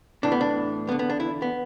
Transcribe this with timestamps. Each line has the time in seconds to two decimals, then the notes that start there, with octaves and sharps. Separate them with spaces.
0.23 A2 E3 D4
0.32 B3
0.41 D4
0.87 E2 B3
0.92 D3
0.99 B3
1.10 D4
1.20 E4
1.42 B3